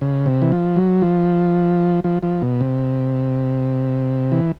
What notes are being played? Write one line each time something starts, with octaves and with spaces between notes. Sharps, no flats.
C#3
C3
E3
F3
F#3
F3
F3
F3
B2
C3
E3